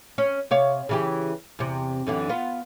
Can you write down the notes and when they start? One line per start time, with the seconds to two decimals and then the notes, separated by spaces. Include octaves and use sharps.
0.18 C#4
0.51 C3 C#5 F5
0.89 C#3 E3 G4
1.59 E2 C3
2.07 F#2 D3 E3
2.29 B3 F4